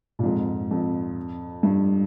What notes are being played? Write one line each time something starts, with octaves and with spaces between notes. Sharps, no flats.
A#2
F2 G#2
F2
G2